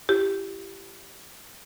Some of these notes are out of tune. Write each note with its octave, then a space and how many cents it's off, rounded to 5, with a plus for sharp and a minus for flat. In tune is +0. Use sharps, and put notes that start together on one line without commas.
E4 +45 G4 +0